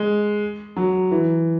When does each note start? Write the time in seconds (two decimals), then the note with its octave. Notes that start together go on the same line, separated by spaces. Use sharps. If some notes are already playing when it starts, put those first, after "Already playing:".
Already playing: G#3
0.76 F#3
1.11 E3